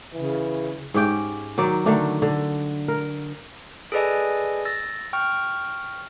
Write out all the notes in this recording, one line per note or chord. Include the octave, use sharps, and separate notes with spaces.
C#3 E3
G#2 C#4 G4 G5
D#3 F#3 D5
D3 D#3 A3 D4
D3
A#4
G#4 A4 B4 D5 D#5 G#5
E6 A6 A#6
G5 C#6 F6